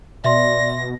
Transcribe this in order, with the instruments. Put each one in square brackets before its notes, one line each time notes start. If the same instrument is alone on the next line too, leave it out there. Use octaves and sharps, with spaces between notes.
[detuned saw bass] B2 [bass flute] D5 [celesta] E5 C6 [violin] A#6